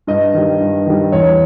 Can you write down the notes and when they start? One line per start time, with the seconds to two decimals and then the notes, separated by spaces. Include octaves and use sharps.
0.07 G2 D#5
0.34 D#3 G3
0.60 G2
0.86 D#3 G3
1.12 E2 C#5